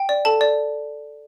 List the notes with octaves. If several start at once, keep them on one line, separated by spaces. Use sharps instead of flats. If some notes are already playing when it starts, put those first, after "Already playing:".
Already playing: G5
D5
A4 A5
D5